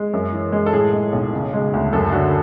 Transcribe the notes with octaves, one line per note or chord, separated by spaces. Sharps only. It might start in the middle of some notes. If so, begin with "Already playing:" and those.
Already playing: G#3
F#2
E3
G#3
A4
A2 G#4
G#3
B1
C#3
G#3
D2
F#2 A4
D3 F#4